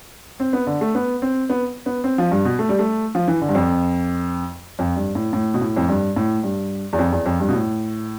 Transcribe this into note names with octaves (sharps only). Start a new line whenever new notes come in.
C4
B3
D3
A3
B3
C4
B3
B3
C4
F3
G2
B2
A3
G3
A3
F3
E3
D3
G2
F2
F2
G2
A2
A2
B2
A2
F2
G2
A2
G2
E2
F2
E2
F2
G2
B2
A2